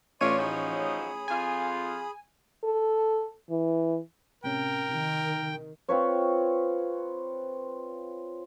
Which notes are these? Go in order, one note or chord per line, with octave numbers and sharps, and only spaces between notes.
A1 C#4 D4 F4 C#5 D5 C6 D#7
F3 F#3 D#4 G#4 B5 D#6
F2 F4 G#5
A4
E3
A2 C3 C#4 A#4 G5
C3 D#3
C4 F4 B4 C#5